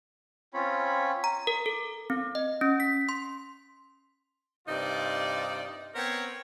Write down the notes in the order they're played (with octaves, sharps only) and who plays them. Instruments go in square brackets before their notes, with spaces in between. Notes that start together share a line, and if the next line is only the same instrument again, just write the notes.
[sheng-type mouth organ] C4 C#4 F4 C#5 B5
[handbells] A#5
A#4
A4
C4
D#5
C#4
B6
C6
[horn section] G2 C3 D#4 F4 D5
B3 C4 A#4 C5 C#5